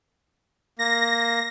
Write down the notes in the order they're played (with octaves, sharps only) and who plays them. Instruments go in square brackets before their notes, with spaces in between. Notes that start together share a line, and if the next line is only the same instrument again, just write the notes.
[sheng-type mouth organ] A#3 [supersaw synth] A#6